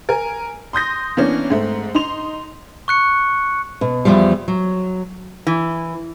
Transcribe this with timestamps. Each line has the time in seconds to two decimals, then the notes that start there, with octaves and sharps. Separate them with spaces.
0.09 A#4 G#5
0.73 C6 D#6 G6 A#6
1.17 E3 A#3 B3 C#4 D4
1.50 G#2 A3 C4
1.95 D#4 C6 F7
2.88 C#6 F#6 C#7
3.81 B2
4.05 E2 E3 F3 G3
4.48 F#3
5.47 E3